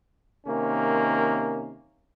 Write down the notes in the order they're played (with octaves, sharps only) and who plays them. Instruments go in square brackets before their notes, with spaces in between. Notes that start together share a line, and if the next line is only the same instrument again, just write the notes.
[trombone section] C3 D#3 A#3 C#4